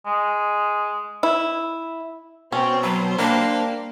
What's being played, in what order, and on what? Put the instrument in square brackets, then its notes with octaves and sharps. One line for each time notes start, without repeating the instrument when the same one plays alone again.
[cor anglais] G#3
[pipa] E4
[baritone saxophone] B2 [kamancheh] C4 G5 [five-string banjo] C#4
[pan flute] F#3 [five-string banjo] B4 [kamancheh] C5
[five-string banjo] G3 [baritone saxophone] A#3 [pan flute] D4